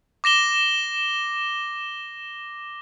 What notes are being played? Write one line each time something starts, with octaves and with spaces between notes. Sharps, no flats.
D6 A#6 E7 G7